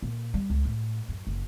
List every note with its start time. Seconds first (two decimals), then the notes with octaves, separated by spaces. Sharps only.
0.02 A#2
0.34 G3
0.50 C#2
0.65 A2
1.09 F#2
1.27 F#1